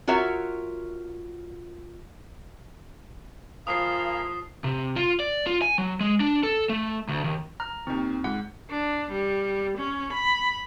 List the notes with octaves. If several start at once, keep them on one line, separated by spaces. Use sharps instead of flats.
F4 F#4 A#4 C#5 E5
F3 E4 G#4 A#4 F5 D#6 C7
C3
F4
D5
F4
G#5
F#3
G#3
D4
A4
A3
D2
D#2
A#5 F6
D#2 D#3 C4
G#2 F#5
D4
G3
C#4
B5